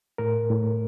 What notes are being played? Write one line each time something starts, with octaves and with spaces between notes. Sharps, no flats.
A2 A#4
A2